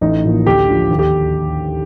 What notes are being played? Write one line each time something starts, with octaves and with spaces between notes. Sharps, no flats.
A1 D#4
A2 F3 A#3
D2 G4
D3 F3
D#2
G4